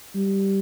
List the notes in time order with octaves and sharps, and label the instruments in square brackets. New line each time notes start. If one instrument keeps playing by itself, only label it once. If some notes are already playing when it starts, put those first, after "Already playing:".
[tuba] G3